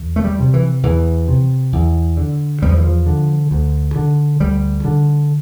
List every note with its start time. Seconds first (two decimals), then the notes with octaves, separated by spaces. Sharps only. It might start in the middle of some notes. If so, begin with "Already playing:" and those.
Already playing: E2
0.16 A3
0.24 G3
0.39 C3
0.54 E3
0.83 E2 E3
1.28 C3
1.72 E2
2.17 D3
2.62 E2 G3
2.69 F3
2.77 E3
2.84 F3
3.06 D3
3.51 D2
3.96 D3
4.40 D2 G3
4.85 D3